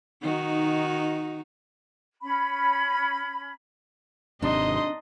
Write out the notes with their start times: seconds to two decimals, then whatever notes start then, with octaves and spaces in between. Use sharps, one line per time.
0.22 D#3 D#4 F#4
2.22 C#4 B5
4.42 G#1 C3 D4 D#4 D#5 C6